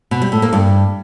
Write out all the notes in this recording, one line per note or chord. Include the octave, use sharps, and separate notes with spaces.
B2
G3
A2
A#3
G2